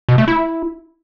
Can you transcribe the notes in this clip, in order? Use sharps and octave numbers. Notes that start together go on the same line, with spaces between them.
B2
A3
E4